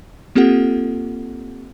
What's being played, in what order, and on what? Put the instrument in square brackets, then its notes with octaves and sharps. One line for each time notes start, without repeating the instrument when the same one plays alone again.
[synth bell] A#3 C4 F4 G4 A4 F#5